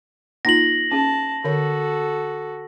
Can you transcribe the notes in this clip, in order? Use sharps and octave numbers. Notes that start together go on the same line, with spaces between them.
A#3 D#4 F4 A#6 F#7
C#4 G#4 A5
D3 F#4 A4 C#5